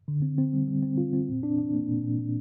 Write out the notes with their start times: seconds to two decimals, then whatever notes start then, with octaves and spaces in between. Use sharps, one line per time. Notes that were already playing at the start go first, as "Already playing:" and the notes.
0.08 D3
0.22 C4
0.38 C4
0.53 G3
0.68 G3
0.82 C4
0.98 F4
1.13 C4
1.29 A#2
1.43 D4
1.58 D4
1.74 A#3
1.88 A#2
2.04 A#2
2.19 A#2